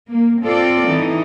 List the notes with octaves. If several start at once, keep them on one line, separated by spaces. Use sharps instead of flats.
A#3
C4 F4 A4 D5
E3 D#4